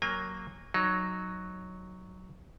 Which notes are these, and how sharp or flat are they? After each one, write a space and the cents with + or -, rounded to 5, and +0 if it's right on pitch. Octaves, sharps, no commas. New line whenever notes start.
F#3 +0 A#3 +0 G#5 -35
F#3 +0 D#4 +0